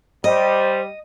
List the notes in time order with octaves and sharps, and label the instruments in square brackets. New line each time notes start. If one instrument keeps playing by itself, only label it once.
[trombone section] G3 [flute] C5 [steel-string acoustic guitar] D#5